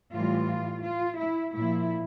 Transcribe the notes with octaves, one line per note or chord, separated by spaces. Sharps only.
A2 E3 G3 F4
F4
E4
A#2 F3 E4